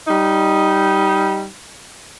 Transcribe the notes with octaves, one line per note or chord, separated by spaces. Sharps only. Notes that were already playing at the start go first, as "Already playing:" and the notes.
G3 D#4